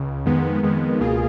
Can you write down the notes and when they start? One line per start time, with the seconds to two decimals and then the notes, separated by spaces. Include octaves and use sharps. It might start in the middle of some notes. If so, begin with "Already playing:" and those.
Already playing: C#2 C#3
0.26 F2 D#3 G#3 B3
0.63 F2 D#3 G#3 B3
1.00 C#2 B2 A#3 F4 G#4